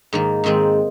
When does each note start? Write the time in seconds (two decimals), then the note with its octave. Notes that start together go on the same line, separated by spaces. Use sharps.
0.13 G#2 D#3 A#3
0.44 G#2 D#3 G#3 C4